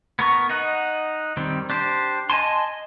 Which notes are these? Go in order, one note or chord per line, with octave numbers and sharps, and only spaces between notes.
B3 A#4 C#6
D#4 D#5 F#5
D#3 G3 C4
D4 G4 C5
D#5 G#5 A5 C6